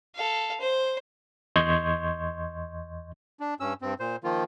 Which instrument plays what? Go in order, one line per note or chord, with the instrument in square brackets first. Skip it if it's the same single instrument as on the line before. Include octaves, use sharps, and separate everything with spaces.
[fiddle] A4 F5
C5
[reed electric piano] E2 D#5 C6 C#6 G6 G#6
[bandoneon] D4
G2 C#4 E6
G2 C4
A#2 C5
D#3 F3 A#3 F4